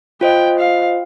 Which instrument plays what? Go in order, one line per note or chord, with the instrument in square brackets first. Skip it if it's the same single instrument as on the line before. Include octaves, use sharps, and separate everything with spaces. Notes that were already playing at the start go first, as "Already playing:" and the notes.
[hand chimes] F4 C5 D#5 [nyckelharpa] G5
[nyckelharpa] F5